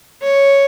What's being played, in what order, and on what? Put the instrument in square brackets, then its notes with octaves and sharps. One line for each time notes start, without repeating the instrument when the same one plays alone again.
[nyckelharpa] C#5